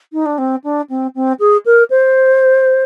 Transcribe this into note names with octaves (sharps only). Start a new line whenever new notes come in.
D#4
D4
C4
D4
C4
C4
G#4
A#4
C5